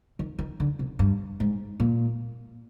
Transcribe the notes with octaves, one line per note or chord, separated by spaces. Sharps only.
D#3
D#3
D3
C3
G2
G#2
A#2